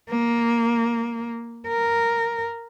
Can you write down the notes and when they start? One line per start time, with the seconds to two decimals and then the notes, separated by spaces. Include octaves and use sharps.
0.10 A#3
1.68 A#4